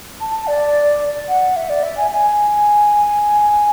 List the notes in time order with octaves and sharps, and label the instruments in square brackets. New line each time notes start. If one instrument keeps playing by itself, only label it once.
[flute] A5
D5
F#5
E5
D5
E5
G#5
G#5